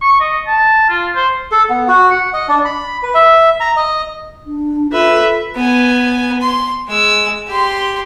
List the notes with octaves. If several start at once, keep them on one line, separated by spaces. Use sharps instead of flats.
C#6
D#5
A5
F4
C5
A4
B3
F#4
F#5
D#5
D4
B5
B4
E5
A#5
D#5
D4
F4 A4 B4 E5
B3 G#5
C6
G#3 E6
G4 C6